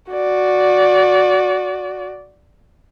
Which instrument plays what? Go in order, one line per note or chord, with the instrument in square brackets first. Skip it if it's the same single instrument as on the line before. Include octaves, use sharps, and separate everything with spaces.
[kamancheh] F#4 D5